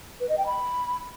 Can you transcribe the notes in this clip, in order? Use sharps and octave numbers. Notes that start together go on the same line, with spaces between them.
B4
D#5
G5
B5